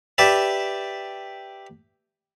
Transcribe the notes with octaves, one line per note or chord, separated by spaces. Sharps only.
G4 B4 D5 E5 A5